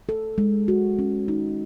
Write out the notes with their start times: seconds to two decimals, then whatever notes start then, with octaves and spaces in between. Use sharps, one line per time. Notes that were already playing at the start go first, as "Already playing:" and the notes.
0.09 A4
0.38 G#3
0.68 F#4
0.99 C#4
1.28 D#4